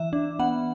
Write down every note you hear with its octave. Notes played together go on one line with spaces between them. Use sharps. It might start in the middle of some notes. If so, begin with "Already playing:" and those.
Already playing: E3 E5
D4
B3 F#5